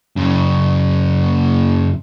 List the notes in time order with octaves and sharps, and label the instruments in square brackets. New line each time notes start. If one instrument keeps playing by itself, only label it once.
[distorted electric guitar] F#2 C#3